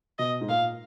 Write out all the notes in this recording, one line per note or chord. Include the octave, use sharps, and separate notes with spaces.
B2 D#5
G#2
A#2 F5